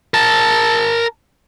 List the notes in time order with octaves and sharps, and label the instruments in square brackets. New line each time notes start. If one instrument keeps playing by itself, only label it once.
[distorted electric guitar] A#4 A5